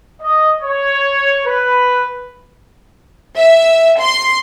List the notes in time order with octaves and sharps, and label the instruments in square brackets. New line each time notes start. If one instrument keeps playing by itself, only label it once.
[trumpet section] D#5
C#5
B4
[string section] E5
C6